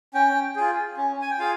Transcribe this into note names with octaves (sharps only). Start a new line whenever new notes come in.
C#4 G5
F4 G#4
C#4
G#5
G5
F4 G#4 F5